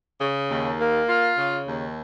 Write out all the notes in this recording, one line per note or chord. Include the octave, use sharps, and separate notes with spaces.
C#3
D#2
A#3
F4
C#3
D#2